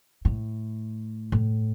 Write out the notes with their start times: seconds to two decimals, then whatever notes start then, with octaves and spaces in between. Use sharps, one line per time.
0.25 A2
1.32 A2